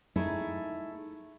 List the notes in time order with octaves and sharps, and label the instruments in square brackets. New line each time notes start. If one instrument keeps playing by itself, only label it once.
[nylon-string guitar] A3 D#4 E4 G#4